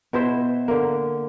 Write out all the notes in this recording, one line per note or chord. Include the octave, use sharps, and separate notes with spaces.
B2 E4 C5 E5
D3 A#3